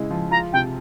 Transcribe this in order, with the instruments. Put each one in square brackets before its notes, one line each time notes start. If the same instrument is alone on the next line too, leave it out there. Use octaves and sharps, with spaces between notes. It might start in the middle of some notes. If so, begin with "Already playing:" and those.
Already playing: [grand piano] C#3 G#3 E4
F3
[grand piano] F4 [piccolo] A#5
[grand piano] C3 [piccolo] G5